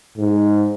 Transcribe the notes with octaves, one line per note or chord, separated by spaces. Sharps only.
G#2